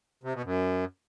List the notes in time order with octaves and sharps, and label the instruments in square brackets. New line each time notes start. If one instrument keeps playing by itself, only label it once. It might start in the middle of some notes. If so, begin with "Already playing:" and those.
[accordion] C3
B2
F#2